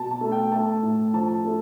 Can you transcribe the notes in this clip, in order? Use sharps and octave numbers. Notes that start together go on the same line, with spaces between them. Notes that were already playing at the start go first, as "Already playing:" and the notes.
Already playing: B2 A5
A5
A3
G5
A3 A5
A2
F3 A5
A3